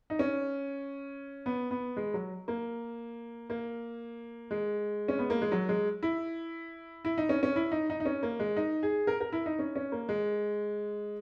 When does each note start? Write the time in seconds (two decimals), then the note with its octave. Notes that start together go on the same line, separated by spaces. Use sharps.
0.10 D#4
0.19 C#4
1.46 B3
1.71 B3
1.97 G#3
2.14 F#3
2.48 A#3
3.50 A#3
4.51 G#3
5.08 C#4
5.19 B3
5.30 A#3
5.42 G#3
5.52 F#3
5.69 G#3
6.03 E4
7.05 E4
7.18 D#4
7.29 C#4
7.43 C#4
7.56 E4
7.72 D#4
7.90 D#4
8.00 D#4
8.05 C#4
8.23 A#3
8.40 G#3
8.57 D#4
8.83 G#4
9.07 A#4
9.21 A#4
9.32 E4
9.46 D#4
9.59 C#4
9.76 C#4
9.92 A#3
10.09 G#3